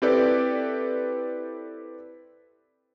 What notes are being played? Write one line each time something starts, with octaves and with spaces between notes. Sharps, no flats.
C4 E4 G4 A4 B4 D5